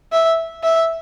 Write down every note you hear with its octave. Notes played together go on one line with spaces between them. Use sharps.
E5
E5